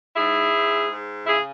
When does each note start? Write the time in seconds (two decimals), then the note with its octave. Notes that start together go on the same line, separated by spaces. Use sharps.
0.16 G#2 E4 G#4
0.54 G#2
0.91 G#2
1.27 C#3 E4 G#4